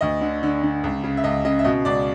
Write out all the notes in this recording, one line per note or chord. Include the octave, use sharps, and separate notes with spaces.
D2 D#5
D3
D3
D3
C#2
C#3
E5
C#2 D#5
C#3 D#5
E5
B2 D#5
C#2 D5